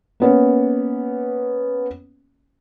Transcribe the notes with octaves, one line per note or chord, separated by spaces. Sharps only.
A#3 B3 C#4